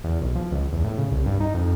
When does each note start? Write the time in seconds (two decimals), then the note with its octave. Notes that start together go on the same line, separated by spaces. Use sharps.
0.04 E2
0.21 B1
0.35 F3
0.52 C#2
0.72 E2
0.84 A2
0.98 C#3
1.11 C2
1.26 G2
1.40 D#4
1.54 F2